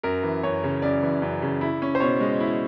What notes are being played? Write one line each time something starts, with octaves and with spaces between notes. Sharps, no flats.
F#2 A#4
E3
F#2 C#5
C#3
F#2 D5
E3
F#2
C#3
E4
C#4
C5
B2 C#5
G#3
E4